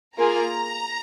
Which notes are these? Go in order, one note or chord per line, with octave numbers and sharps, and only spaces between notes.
A#3 F4 G#4 A#5